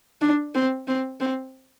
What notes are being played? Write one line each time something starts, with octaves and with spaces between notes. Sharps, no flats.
D4
C4
C4
C4